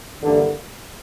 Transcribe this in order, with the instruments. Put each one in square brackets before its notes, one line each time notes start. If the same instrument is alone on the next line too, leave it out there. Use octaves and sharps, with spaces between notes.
[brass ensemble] G2 E3 A#3 E4 A4 [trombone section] D3